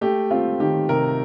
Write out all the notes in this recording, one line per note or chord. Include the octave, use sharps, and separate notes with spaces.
A3 G4
C4 F4
D#3 G4
C3 A#4